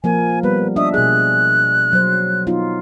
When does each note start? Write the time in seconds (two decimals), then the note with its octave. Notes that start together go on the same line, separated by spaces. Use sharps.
0.04 F3 A#3 A#4 G#5
0.43 G3 B3 B4
0.76 D4 D#5 E5 D#6
0.94 B2 G#4 F#6
1.93 F#3 C5
2.47 B3 D#4 F4